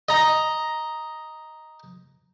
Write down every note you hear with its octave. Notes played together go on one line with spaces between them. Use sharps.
D#5 A#5